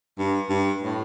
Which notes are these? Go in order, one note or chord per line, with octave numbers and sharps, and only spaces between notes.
G2
G2
A2